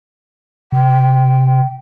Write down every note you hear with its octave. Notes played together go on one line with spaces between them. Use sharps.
C3 G5